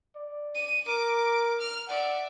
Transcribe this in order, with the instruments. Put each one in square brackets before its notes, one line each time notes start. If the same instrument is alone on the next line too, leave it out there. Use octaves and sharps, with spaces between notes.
[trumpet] D5
[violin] D#7
[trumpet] A#4 [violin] D6
[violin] F6
[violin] D5 E5 [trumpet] F#5